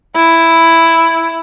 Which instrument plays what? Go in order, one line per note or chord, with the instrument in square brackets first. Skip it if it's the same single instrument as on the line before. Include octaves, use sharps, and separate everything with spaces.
[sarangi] E4